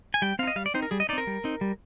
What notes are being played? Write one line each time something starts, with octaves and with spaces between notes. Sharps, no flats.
G#5
G3 G5
C4 D#4 F5
D#5
G3 F5
D5
C4 D#4 C5
A#4
G3 G#4
D#5
C4 D#4 A#4 D5
G3
C4 D#4
G3